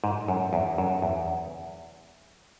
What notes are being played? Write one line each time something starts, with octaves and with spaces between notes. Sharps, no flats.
G#2
F#2
E2
F#2
E2